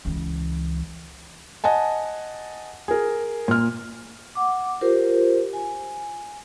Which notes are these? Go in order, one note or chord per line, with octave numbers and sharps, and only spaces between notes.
C#2 E3
D#5 F#5 G#5 A5
G#4 A#4
A#2 F6
F#5 D6
F4 G4 A#4 C5
G#5